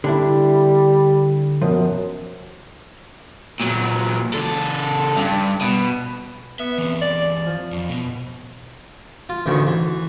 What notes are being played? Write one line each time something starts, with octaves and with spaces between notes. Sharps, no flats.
D3 G3 D4 E4
F#2 B2 F3
A#2 F#3
C#3 A4
G2
B2
B3 E5
E3 C4
D5
F3
F2
B2
F4
A1 D2 D#3 C#6
E3